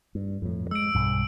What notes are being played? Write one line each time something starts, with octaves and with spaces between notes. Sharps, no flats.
G2
F2 A2
G#3 E6 D7
B1 G2